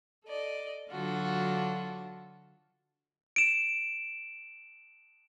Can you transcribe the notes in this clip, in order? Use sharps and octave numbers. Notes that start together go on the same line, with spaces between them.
A4 D5 D#5
D3 F#3 D4 F4 F#4 A4
D7 E7